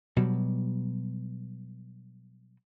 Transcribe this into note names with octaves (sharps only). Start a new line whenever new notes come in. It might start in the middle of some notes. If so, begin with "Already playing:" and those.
B2 F#3 G3